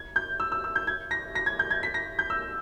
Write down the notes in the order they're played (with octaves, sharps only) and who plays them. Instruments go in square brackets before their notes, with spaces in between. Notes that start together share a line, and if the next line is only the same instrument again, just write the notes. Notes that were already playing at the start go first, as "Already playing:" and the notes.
Already playing: [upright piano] G#6
G6
E6
E6
E6
G6
G#6
A#6
A#6
G#6
G6
G#6
B6
A#6
G6
E6